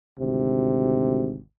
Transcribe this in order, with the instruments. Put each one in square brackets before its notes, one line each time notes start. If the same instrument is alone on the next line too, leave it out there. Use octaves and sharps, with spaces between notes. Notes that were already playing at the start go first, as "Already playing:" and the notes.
[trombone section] G#1 D2 C3